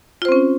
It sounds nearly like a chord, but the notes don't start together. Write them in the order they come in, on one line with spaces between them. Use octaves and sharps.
F4 C5 C4 C#4